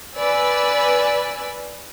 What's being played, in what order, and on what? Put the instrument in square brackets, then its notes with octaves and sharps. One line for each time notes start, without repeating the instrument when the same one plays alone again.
[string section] B4 D5 G#5 E6